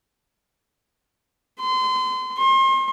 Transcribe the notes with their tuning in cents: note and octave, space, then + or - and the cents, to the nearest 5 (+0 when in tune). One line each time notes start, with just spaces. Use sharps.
C6 -30
C6 +40